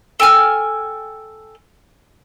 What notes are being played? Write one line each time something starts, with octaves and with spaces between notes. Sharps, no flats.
A4 G5 G#5 F6